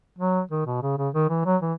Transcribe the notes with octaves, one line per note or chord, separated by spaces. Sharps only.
F#3
D#3
B2
C#3
C#3
D#3
E3
F#3
E3